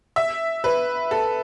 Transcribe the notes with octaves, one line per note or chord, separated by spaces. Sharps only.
E5
B4
A4